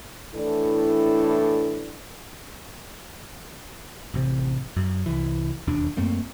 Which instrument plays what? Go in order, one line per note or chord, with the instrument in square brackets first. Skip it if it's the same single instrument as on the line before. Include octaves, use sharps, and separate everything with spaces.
[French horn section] A2 E3 D4 E4 A4 D5
[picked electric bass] A1 C3
F#2
C2 E3
E1 D#2 D4
F#2 A3 A#3 C4